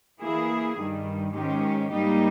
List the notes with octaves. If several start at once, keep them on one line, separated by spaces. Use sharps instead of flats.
E3 A#3 E4 G#4
G2 D#3 G3
G#2 D#3 G#3 C#4 G4
G#2 G3 A#3 D#4 G4